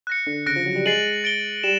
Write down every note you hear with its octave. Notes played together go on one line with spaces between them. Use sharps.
F#6 A#6 C#7
D3
C#3 F#6 A#6 D7
F3
F#3
G3
G#3 A6 C7 D#7 F#7
A6 D7 G7
G3 E7